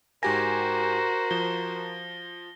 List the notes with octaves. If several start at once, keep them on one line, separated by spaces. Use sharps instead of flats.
G#2 F#4 G4 A#4 C5 G#5 A#6
F3 G7